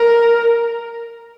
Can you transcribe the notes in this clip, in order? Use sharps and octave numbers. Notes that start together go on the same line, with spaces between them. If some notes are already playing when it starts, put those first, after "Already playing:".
Already playing: A#4